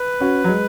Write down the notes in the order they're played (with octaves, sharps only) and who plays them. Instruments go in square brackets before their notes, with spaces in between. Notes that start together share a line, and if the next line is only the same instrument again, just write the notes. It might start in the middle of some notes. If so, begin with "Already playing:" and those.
Already playing: [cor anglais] B4
[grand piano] C#4 F#4
F#3
G#3